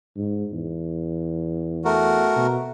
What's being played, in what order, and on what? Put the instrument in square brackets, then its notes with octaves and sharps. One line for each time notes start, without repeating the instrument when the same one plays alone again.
[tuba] G#2
E2
[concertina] A3 F#4 A#4
[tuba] B2